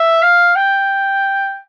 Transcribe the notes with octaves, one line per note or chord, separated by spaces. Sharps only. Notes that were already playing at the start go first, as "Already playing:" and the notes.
Already playing: E5
F5
G5